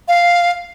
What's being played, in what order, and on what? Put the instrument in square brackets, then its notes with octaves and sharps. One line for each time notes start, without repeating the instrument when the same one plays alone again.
[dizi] F5